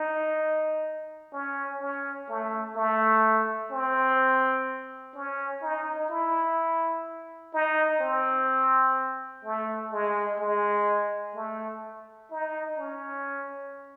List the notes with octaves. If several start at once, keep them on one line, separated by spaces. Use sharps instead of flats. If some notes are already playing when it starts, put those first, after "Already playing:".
Already playing: D#4
C#4
C#4
A3
A3
C4
C#4
D#4
E4
D#4
C4
A3
G#3
G#3
A3
D#4
C#4